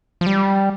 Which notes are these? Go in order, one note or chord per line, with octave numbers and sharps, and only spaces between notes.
F3
G3